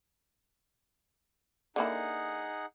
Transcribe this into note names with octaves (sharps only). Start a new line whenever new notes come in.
D3 A#3 D#4 E4 G#4 F#5